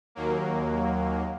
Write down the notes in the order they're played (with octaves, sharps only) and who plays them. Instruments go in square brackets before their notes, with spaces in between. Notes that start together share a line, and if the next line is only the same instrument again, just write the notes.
[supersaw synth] D#2 F#3 A#3